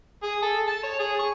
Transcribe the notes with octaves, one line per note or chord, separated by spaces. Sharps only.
G#4
A4
A5
C#5
G#4
C#6